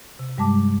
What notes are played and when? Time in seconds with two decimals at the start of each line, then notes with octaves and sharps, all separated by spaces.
0.19 C3
0.38 G2 G3 G#3 A5 D6